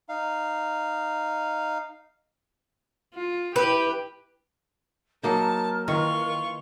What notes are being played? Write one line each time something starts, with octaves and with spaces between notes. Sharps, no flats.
D#4 F5
F4
E4 G4 B4
F#3 A#3 D#4 A#4 A5
D#3 E3 F4 C#6